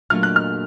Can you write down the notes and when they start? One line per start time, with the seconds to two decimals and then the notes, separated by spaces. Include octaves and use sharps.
0.10 A#2 F#3 A3 D4 F4 F6
0.23 F#6
0.36 F6